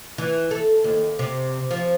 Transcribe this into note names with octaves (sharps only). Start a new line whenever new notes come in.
E3
A4
D#2
C3
F3